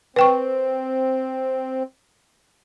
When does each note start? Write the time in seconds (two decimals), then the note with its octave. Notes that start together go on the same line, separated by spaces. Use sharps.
0.16 C4 B4 G5 C#6